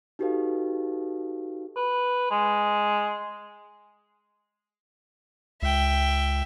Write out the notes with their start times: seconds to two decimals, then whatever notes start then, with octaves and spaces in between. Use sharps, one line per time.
0.19 D#4 F#4 G4 A4 B4 F5
1.76 B4
2.31 G#3
5.62 C#2 E5 G5